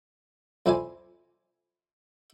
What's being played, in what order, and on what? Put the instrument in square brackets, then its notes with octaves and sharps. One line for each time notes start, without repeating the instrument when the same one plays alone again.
[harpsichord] F2 C4 E4 D5 G#5